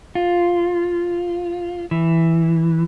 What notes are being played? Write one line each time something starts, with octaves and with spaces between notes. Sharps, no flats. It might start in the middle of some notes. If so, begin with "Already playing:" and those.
F4
E3